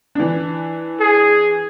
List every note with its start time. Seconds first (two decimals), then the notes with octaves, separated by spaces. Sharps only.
0.15 E3 D4
1.00 G#4